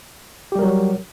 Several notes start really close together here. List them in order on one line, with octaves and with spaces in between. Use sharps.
G4 G3 A#4 F#3